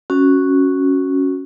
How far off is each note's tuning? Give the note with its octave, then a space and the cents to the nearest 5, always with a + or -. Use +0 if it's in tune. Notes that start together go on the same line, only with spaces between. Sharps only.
C#4 +0 F#4 +0